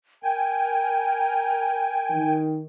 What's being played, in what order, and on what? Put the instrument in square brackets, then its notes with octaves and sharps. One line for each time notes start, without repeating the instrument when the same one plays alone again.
[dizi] A#4 [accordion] G5 G#5
[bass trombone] D#3